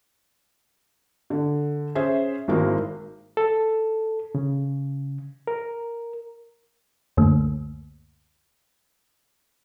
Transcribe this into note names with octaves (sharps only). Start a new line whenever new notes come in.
D3
C#4 G#4 C5 E5
G#1 D#3 G#3 A#3 E4 F#4
A4
C#3
A#4
C#2 F#2 D3 A3 A#3